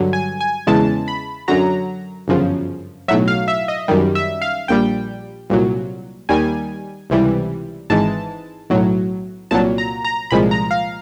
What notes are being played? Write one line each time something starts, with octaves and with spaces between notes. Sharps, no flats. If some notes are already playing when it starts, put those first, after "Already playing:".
Already playing: G2 D3 F#3
G#5
G#5
E2 C#3 E3 G#3 A5
B5
F#2 D3 F#3 A#5
G1 F#2 C#3 F3
B1 A2 F#3 E5
F5
E5
D#5
F#2 D#3 G3
E5
F5
A#1 A#2 G3 G5
C2 A#2 F#3
D#2 D#3 G3 G#5
C#2 C3 E3 G3
G#1 G#2 E3 G#3 A5
B1 A2 F#3
C2 A#2 F#3 A5
A#5
A#5
C2 A#2 F3 G#3 B5
A#5
F5